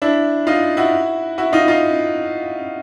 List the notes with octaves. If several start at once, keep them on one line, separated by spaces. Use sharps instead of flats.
D4 E4
D#4 F4
E4 F#4
E4 F#4
D#4 F4
D#4 F4